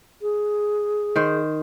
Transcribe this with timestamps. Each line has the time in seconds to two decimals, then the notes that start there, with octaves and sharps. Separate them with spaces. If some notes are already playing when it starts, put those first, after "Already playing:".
0.22 G#4
1.16 D#3 C5